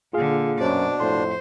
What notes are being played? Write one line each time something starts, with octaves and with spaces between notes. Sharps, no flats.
A#2 D3 F4 G#4 F5
F#2 B2 C#4 D4 C5 D5
F2 A2 C5 C6